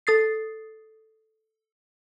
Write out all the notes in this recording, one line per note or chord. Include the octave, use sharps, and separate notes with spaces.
A4 D#6 A6 C7